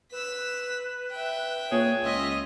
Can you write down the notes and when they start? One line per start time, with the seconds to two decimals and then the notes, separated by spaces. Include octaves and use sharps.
0.12 B4 E6 B6
1.11 E5 G5
1.72 A#2 G#4 C#5
2.04 C#2 F4 D#5 E5